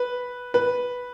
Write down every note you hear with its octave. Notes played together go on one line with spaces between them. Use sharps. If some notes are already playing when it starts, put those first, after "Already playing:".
Already playing: B4
B4